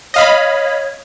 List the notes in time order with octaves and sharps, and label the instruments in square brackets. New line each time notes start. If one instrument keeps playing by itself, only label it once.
[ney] C#5 [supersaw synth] D#5 F5 B5